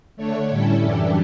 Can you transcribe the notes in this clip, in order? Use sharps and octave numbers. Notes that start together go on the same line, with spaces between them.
D3 A3 D4 C#5
A2 G3 C#4 E4 A4
F#2 E3 G3 D4 G4